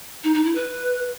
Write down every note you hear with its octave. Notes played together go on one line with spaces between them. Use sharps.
D#4
D#4
E4
B4